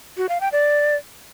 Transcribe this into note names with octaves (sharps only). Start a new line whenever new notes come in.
F#4
F5
G5
D5